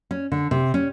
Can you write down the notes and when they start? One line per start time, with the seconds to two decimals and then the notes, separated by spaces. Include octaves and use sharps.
0.11 C#4
0.32 D3
0.51 C3
0.74 C#4